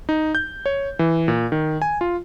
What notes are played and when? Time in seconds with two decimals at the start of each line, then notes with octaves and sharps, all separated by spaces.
0.09 D#4
0.35 G6
0.66 C#5
0.99 E3
1.28 A#2
1.52 D#3
1.82 G#5
2.01 F4